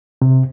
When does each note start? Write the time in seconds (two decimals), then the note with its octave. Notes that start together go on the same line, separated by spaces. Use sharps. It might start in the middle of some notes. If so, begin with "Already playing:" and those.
0.22 C3